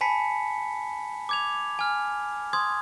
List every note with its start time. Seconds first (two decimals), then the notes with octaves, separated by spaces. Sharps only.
0.01 G#5 A5 B5 B6 C#7
1.29 D6 G#6 F7
1.79 G#5 F6
2.53 C6 D#6 G#6